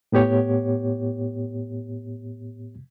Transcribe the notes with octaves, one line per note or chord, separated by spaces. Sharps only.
A2 B3 G4 C#5